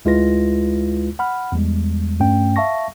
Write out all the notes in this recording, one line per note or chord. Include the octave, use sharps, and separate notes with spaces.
D2 G#3 E4 F4 B4 A#6
F#5 B5 F6
E2 G3 G#3
G2 A3 C#4 G5
E5 F5 A5 C#6 A#6